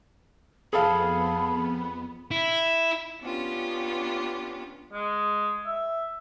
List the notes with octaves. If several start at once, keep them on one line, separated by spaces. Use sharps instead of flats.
F2 B3 G#4 A4 F5 B5
E4
B3 C#4 D4 F4 G4
G#3
E5